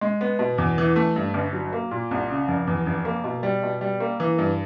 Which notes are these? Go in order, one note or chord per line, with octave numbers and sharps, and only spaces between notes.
G#3
B3
B2
E2
E3
A3
G2
G1
F#3
A#3
A#2
C2
C#3
F1
E2
F1
A#3
B2
G3
B2
G3
A#3
E3
G2